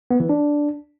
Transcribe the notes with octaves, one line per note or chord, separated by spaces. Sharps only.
B3
E3
D4